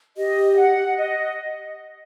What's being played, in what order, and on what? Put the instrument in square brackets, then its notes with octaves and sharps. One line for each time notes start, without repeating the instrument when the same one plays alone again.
[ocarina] G4 [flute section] D#5
[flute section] F#5
D#5